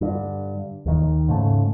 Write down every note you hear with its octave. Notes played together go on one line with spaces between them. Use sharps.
G2 D3
D#2 D#3
G#2 C#3 A3